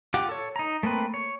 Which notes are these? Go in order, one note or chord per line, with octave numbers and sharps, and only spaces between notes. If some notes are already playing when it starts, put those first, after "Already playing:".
F4 G4 F#5 D6
A4 C#5
D#4 A#5
A3 A#3 C4 B4
C#5